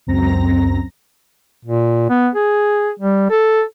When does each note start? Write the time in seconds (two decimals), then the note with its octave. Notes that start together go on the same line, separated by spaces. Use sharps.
0.07 C#2 F#2 C4 A#5 A#6
1.65 A#2
2.10 B3
2.35 G#4
3.00 G3
3.30 A4